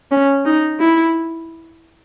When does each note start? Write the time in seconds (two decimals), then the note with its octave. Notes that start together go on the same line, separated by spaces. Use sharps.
0.11 C#4
0.45 D#4
0.79 E4